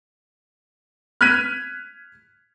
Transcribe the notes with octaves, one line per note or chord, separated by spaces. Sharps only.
F6 F#6 G#6 B6 D#7